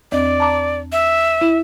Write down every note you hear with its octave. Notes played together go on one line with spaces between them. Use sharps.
E2 C4 D5 D#5
A5 A#5 D6
E5
E4